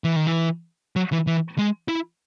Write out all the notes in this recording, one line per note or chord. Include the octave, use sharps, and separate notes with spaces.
E3
D#3
E3
F#3
E3
E3
G#3
E4